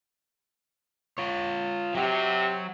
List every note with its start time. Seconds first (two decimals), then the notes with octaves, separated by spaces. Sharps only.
1.18 F4 C#5
1.95 C3 F#3 F#4